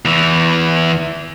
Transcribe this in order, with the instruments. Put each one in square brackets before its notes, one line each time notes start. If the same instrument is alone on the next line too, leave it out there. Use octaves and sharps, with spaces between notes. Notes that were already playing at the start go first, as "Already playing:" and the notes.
[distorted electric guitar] E2 E3